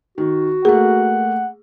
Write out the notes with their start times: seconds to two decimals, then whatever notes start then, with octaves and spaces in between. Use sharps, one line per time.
0.18 D#3 F#4
0.65 A3 A#3 G#4 F#5